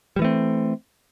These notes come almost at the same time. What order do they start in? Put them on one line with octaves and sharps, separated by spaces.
G3 E3 A3 C4